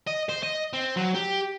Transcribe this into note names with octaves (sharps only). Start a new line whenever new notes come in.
D#5
C5
D#5
C4
F#3
G4